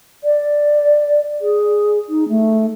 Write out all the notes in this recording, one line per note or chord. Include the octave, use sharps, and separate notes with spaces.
D5
G#4
D#4
A3